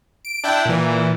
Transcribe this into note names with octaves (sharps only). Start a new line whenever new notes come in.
D7
D4 E4 G5
A#2 E3